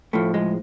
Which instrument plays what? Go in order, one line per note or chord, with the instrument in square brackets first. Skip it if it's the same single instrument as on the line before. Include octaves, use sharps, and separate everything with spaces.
[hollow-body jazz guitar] A2 F3 A3
G#3